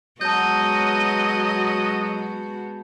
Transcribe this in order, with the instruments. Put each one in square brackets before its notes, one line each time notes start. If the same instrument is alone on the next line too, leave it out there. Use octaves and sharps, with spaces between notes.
[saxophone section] F#3 [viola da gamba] G#3 B3 F#4 [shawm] D#5 [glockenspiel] A5 G6